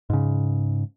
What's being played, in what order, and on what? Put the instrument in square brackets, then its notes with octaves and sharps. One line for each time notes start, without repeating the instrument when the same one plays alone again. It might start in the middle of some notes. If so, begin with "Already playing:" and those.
[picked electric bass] G#2 C#3